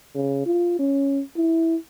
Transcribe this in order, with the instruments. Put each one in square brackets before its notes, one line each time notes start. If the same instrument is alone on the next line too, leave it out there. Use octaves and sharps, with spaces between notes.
[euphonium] C#3
F4
C#4
E4